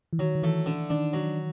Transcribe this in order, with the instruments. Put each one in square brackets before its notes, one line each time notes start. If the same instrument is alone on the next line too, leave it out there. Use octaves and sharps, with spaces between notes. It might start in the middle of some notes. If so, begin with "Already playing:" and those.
[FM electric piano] E3
[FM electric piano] D#3 [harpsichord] F#3
[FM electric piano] D#3
[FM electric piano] E3 [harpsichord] A3
[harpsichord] D3
[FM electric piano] D#3 [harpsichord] D4
[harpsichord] F#3